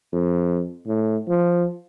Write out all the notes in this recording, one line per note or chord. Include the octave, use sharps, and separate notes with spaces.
F2
A2
F3